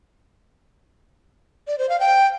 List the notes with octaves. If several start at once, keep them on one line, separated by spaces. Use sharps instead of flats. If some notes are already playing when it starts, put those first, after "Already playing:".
D5
C5
F5
G5